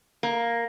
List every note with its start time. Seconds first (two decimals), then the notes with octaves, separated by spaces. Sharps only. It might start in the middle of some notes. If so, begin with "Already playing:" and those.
0.23 A#3